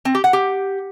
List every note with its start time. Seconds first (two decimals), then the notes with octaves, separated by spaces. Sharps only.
0.05 C4
0.15 G4
0.24 F#5
0.33 G4